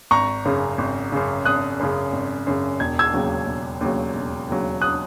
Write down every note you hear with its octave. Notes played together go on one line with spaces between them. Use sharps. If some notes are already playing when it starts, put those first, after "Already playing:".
G#1 A#5 C#6
F#2 C#3
G#1
F#2 C#3
G#1 D#6 F#6
F#2 C#3
G#1
F#2 C#3
E1 G#6
E6 G#6
D#2 C#3 F#3
E1
D#2 C#3 F#3
E1
D#2 C#3 F#3
D#6 F#6